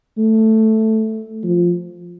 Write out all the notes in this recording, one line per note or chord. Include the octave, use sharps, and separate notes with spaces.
A3
F3